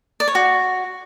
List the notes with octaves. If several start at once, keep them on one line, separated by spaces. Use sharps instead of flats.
D5
C#5
F#4